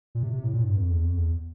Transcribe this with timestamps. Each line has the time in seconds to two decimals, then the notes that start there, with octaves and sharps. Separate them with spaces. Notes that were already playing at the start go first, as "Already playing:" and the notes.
0.15 A#2
0.23 C3
0.33 C3
0.44 A2
0.54 A#2
0.64 G2
0.77 F2
0.90 E2
1.04 F2
1.17 E2